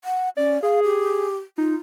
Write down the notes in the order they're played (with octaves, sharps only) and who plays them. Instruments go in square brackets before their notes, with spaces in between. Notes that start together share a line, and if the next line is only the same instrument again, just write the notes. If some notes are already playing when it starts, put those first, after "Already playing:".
[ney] F#5
[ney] C#4 [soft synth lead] D5
[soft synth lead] G#4 [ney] F5
[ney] G4
[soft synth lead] D#4 [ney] F4